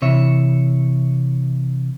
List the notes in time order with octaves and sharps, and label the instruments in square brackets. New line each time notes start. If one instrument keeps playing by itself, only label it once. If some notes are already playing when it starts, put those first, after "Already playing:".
[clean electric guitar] C3 E3 C#5 E5